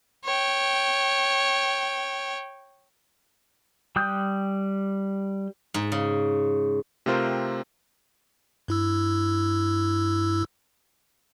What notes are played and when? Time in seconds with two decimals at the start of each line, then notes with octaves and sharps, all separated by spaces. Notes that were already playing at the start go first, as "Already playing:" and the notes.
0.25 C#5 G5
3.96 G3 G5 D#6 F#6 G6
5.74 G#2
5.92 C#3
7.06 C3 A3 C4 F4 A#4 C5
8.68 G2 E4 E6